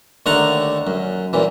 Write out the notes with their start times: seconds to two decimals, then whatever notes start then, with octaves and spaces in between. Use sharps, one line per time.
0.26 D#2 D3 A3 F#5 A5 A#5
0.87 F#2
1.33 F#2 A#2 E3